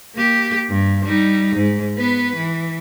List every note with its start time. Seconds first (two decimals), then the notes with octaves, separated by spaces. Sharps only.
0.15 A#3 G4
0.69 G2
1.05 G3 D#4
1.56 G#2
1.98 B3 B4
2.36 E3